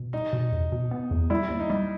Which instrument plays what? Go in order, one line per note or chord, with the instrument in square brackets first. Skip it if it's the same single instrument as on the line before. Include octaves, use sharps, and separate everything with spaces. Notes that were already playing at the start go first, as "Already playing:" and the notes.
Already playing: [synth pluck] B2
[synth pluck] G3 [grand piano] D#4
[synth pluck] B2
E2
B2
B3
E2
[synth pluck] G3 [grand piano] E4
[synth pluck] D#2
[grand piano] D#4
[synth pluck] G3